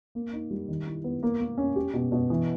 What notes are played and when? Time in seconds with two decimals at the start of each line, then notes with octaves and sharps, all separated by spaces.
0.15 A#3
0.33 D#4
0.50 G3
0.68 D#3
0.87 E4
1.04 B3
1.23 A#3
1.40 A#3
1.58 C#4
1.76 G4
1.93 B2
2.12 B2
2.30 E3